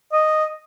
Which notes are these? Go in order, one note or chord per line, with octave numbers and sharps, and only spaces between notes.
D#5